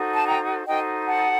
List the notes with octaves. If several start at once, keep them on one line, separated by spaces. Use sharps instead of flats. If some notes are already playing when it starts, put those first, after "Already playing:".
Already playing: D#4 F#4 A4 C5
A5
G5 A#5
D#4 F#4 A4 C5 D#5 G5
F#5 A5